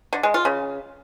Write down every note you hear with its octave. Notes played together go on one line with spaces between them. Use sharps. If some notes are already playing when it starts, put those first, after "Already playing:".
D3
G#3
F4
C#3